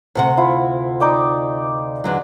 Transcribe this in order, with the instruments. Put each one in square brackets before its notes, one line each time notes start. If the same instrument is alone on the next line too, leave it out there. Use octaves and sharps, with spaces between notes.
[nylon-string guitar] D2 C3 F#5
[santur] E4 F4
D#4 D5 G5
[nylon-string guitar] E2 D3 F#3